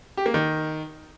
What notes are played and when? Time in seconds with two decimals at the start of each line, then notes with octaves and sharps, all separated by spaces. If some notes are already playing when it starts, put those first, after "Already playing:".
0.17 G4
0.26 A#3
0.34 D#3